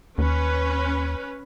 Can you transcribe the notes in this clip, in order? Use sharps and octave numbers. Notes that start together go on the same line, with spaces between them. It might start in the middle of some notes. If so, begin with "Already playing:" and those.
D#2 C#4 B4